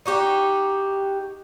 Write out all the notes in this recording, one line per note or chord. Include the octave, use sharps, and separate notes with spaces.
D#4 F#4 G4